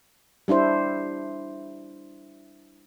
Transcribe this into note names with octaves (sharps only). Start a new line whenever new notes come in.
G3 D4 E4 C5